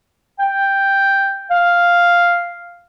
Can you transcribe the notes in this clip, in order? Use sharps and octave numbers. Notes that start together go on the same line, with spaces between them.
G5
F5